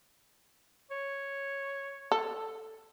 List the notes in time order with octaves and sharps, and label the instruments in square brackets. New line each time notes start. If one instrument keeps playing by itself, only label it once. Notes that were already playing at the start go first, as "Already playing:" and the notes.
[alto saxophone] C#5
[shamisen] A4